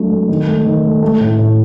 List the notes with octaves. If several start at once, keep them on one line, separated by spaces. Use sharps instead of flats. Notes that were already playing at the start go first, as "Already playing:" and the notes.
Already playing: F#3 A3 C4 D4
A3
D#3
A3
D#3
A3
A3
A2
A2